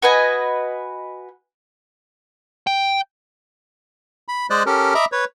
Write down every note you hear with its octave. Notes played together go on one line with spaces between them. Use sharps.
F#4 B4 D#5 G#5
G5
B5
G#3 C5 D5 D#5 F#6
C#4 G4 A4 A#4
D#5 E5 A#5 B5 D6
B4 C#5